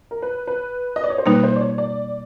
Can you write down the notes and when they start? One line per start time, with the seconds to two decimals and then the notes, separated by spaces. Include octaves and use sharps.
0.11 A#4
0.22 B4
0.48 B4
0.96 D#5
1.04 D5
1.10 C#5
1.18 C5
1.26 B2 G3 A#3 D#4 B4
1.44 C5
1.56 D5
1.61 C#5
1.78 D5